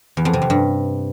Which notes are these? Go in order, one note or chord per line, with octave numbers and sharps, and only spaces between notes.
E2
F2
C3
F2
G2